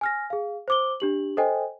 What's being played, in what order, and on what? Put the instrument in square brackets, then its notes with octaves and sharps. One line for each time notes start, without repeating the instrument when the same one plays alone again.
[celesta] G#5 F6 A#6
G#4 F5
C5 D6 G7
D4 G4 F#7
A4 C5 D#5 G5 G#5